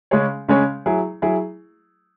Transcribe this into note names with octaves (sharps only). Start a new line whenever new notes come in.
C#3 G#3 C#4 G#4 C#5
C#3 G#3 C#4 G#4 C#5
F#3 E4 G#4
F#3 E4 G#4